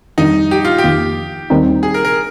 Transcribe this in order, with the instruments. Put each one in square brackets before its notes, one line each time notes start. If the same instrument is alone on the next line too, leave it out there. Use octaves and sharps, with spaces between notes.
[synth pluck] F2 D#3 G3 [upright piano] D#4
[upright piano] G4
F4
G4
[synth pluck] F2 D#3 A#3
D#2 D#3 G3 C4 D#4
[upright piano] G#4
A#4
A#4